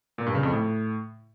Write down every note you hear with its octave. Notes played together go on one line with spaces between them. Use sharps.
A#2
G2
C#3
F2
A2